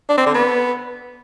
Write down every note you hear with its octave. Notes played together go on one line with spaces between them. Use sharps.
D4
C4
D3
B3